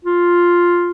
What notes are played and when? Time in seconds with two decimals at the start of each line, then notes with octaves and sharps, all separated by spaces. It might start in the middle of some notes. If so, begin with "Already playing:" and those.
0.05 F4